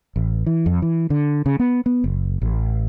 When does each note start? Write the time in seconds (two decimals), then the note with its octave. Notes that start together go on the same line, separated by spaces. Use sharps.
0.16 A1
0.46 E3
0.66 F2
0.82 E3
1.10 D3
1.46 C#3
1.59 B3
1.86 B3
2.04 F#1
2.42 A1